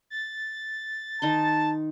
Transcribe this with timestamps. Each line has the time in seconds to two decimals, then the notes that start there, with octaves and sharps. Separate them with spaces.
0.10 A6
1.22 D#3 D#4 A5 C6